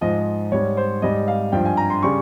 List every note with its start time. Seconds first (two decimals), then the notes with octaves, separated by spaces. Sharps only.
0.01 G#2 F3 D#5
0.52 G#2 G3 C#5
0.77 C5
1.02 G#2 G3 D#5
1.28 F5
1.52 G2 F3 G5
1.65 G#5
1.77 A#5
1.90 C6
2.03 C#3 G3 C#6